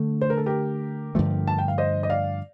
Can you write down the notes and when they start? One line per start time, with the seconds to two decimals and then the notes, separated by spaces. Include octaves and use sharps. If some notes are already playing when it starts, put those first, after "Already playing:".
Already playing: D3 A3 D4
0.21 C5
0.30 A#4
0.37 A4
0.46 G4 A#4
1.15 G2 D3 F3 A3
1.47 A5
1.58 G5
1.68 F5
1.78 C5 D#5
2.03 D#5
2.09 D5 F5